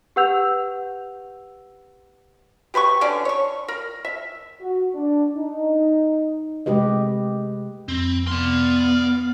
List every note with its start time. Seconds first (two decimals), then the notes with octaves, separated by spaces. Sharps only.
0.16 G4 B4 F#5 E6 G6 F7
2.74 G4 B4 B5 C#6
3.01 D3 C#4 D5
3.25 C#5 C#6
3.68 A#4
4.05 E5
4.60 F#4
4.95 D4
5.36 D#4
6.66 C3 G#3 A3 G4 B4 D#5
7.88 F2 C4 B5
8.27 B3 D5 F5 C6